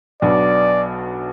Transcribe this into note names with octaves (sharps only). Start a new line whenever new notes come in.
B1 B2 F#3 B3 D4 D5